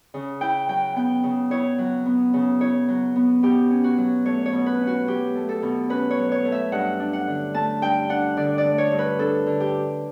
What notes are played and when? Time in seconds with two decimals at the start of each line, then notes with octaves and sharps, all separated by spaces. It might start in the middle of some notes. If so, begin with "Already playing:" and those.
0.14 C#3
0.41 E4 G5
0.68 F#3 G5
0.96 B3 G5
1.23 C#3
1.51 E4 C#5
1.78 F#3
2.06 B3
2.34 C#3
2.61 E4 C#5
2.88 F#3
3.16 B3
3.43 B2 G4
3.71 C#4
3.84 F#4
3.98 F#3
4.25 A3 C#5
4.46 C#5
4.53 B2
4.66 B4
4.80 C#4
4.87 F#4
5.07 F#3 G4
5.35 A3
5.49 A4
5.62 B2
5.89 C#4 B4
6.10 C#5
6.17 F#3
6.32 C#5
6.45 A3
6.52 E5
6.72 G2 F#5
7.00 D4
7.13 F#5
7.27 D3
7.54 A3 A5
7.82 G2 G5
8.09 D4 F#5
8.37 D3 D5
8.58 D5
8.64 A3
8.78 C#5
8.92 G2
8.99 B4
9.19 D4 A4
9.46 D3
9.60 G4